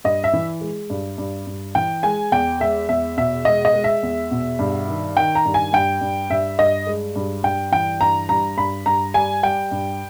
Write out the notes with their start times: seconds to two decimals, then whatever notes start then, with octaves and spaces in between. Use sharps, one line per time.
0.04 G2 D#5
0.24 E5
0.33 E3
0.61 G#3
0.90 G2
1.18 G2
1.47 G2
1.75 E3 G5
2.03 G#3 G#5
2.32 E2 G5
2.60 G#3 E5
2.89 E2 E5
3.17 B2 E5
3.45 G#3 D#5
3.65 D#5
3.74 G#3
3.84 E5
4.03 E2
4.31 B2
4.59 G2
4.88 D#3
5.17 D#3 G5
5.35 A#5
5.45 G2
5.54 G#5
5.73 G2 G5
6.01 G2
6.30 G2 E5
6.59 G2 D#5
6.87 G#3
7.16 G2
7.44 G2 G5
7.72 E3 G5
8.01 G2 A#5
8.29 G2 A#5
8.58 G2 B5
8.86 G2 A#5
9.14 G3 G#5
9.43 G3 G5
9.71 G2